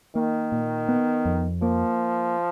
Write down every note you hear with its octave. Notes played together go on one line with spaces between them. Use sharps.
D#3 A#3
A#2
B3
F2
F3 A#3